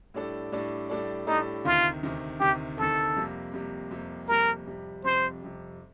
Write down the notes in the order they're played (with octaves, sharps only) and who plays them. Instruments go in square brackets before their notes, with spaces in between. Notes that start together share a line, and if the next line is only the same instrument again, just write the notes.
[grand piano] A2 G3 D4 A4 D5
A2 G3 D4 A4 D5
A2 G3 D4 A4 D5
[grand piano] A2 G3 D4 A4 D5 [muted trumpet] D#4
[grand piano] D2 C3 D#3 [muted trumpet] F4
[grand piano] D2 C3 D#3
[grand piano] D2 C3 D#3 [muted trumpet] G4
[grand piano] D2 C3 D#3 [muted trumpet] A4
[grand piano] F2 C3 G3 A#3
F2 C3 G3 A#3
F2 C3 G3 A#3
[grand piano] F2 C3 G3 A#3 [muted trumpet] A#4
[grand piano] F2 C3 G3
[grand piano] F2 C3 G3 [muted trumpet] C5
[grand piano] F2 C3 G3